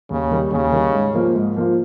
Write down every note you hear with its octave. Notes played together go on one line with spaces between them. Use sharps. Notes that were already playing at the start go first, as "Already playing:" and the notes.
D#2 C#3
D#3 G3
D#2 C#3
D#3 G3
G#2
F3 A#3 F4
G#2
F3 A#3 F4